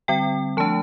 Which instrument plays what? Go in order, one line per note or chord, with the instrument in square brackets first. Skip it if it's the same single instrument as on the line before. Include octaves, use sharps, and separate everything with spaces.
[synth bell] D3 G3 C4 G5
F3 A3 D4 A5